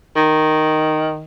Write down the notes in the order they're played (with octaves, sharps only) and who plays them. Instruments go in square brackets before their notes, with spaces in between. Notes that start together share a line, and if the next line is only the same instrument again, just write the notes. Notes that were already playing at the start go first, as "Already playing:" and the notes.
[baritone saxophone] D#3